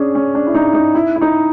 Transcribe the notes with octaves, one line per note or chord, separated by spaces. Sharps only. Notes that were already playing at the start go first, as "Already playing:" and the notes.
Already playing: C#4 D4 G#4
C#4
D4
E4
D#4
D#4
E4
E4
D#4